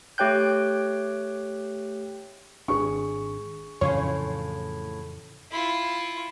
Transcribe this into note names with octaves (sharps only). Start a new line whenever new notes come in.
A3 G4 C#5 G5 F#6 G6
G#1 D4 G#4 C#6
F2 A2 C#3 E3 C#4 F4 C#5
E4 F4